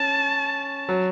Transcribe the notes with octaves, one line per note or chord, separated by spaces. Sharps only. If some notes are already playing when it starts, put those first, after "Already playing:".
Already playing: C#4 A5
F#3